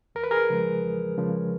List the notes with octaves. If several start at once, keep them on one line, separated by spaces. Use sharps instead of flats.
E2 A#4
B4
G#4 A#4
C#3 F3 G#3
E2
C#3 F3 G#3